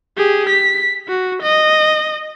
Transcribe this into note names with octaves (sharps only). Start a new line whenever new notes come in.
G4 G#4
B6
F#4
D#5